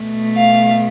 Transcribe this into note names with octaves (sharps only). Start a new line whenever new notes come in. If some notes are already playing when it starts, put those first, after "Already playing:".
Already playing: B2 A3
F5